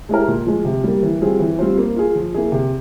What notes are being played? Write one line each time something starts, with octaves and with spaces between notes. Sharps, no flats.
G#3 E4 G4 A#4
A#2
F3 G#3
C3
G3 A#3
E3
G3 C4 F4 G#4
E3
G3 C4 F4 C5
A#3
F4 G#4
F3
A#3 E4 G#4
C3